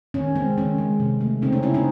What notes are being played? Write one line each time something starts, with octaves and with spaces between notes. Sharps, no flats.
D#3 C#4
G#3 C4
D#3 C#4
G#3
C3
A3
C#3 C4 D#4
C#4
C#3 C#4 E4
C4 D#4